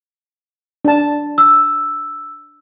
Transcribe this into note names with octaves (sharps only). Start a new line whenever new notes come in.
D4 A5
E6